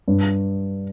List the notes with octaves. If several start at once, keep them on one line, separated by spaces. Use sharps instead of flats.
G2